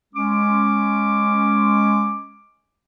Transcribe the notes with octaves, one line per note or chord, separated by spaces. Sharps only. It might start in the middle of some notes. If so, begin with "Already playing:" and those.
G#3 C#4 D6